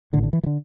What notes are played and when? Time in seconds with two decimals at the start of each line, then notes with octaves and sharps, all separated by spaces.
0.13 A2 D3
0.17 A1
0.23 D3
0.33 E3
0.43 E3
0.46 D3